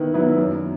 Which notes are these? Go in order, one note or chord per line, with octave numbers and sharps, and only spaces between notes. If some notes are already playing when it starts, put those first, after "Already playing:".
Already playing: D#3 B3 E4
F#3 B3 E4
F#2